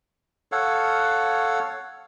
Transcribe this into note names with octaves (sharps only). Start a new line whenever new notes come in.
A4 C#5 F5 F#5